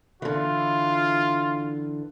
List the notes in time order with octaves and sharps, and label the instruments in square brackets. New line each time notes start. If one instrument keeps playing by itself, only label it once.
[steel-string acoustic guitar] D3 E3 [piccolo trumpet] F4